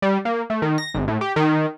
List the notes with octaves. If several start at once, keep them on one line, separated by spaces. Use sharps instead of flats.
G3
A#3
A3
D#3
A#6
G#1
A2
G4
D#3